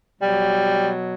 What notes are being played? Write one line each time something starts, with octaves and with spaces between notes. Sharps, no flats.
B2 F#3 G3